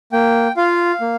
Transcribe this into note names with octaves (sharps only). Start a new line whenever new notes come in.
A#3 G5
F4 F5
A#3